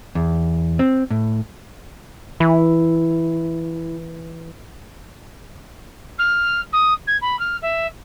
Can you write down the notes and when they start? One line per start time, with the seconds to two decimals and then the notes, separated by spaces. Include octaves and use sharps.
0.15 E2
0.79 C4
1.11 A2
2.40 E3 E4
6.18 F6
6.72 D#6
7.07 G#6
7.21 B5
7.39 F6
7.61 E5